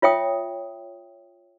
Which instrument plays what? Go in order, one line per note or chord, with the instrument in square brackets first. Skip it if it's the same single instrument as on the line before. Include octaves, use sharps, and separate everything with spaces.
[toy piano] F4 C#5 E5 G5 D#6